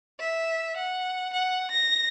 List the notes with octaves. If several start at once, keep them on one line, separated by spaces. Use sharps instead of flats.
E5
F#5
F#5
A#6